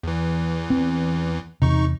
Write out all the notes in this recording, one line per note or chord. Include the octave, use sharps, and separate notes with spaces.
E2 E3
C4
E2 C3 D#4 C#6